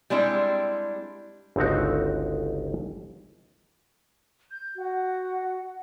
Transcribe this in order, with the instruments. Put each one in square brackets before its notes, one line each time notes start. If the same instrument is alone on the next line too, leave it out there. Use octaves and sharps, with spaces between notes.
[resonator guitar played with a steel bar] G3 G#3 C4 D4 E4
[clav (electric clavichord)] G1 C#2 C4 D#4 F#4
[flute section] G6
F#4 F#5